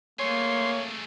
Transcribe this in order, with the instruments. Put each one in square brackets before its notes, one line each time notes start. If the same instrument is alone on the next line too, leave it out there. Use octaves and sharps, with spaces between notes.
[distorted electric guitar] A3 G#4 [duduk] A#3 [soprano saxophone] C#5 [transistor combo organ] C6